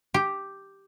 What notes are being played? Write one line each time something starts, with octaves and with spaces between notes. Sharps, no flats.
G4